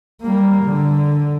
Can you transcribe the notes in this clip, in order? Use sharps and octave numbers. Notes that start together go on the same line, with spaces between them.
G3 A#3
D3